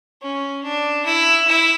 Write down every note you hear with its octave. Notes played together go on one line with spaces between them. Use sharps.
C#4
D4
E4
E4